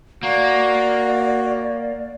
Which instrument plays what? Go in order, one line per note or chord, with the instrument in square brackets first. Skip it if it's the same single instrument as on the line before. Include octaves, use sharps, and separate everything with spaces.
[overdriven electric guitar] A#3 [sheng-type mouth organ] F#4 [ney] D5